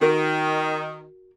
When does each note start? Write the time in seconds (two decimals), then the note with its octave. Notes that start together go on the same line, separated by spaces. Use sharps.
0.01 D#3 F#4 A#4